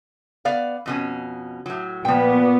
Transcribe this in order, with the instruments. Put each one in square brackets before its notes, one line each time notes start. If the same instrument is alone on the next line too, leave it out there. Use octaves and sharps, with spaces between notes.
[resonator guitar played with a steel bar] B3 D5 F5
F2 B2 C#4
A2 F#3
[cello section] A#2 B3 [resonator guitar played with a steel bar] F3 G5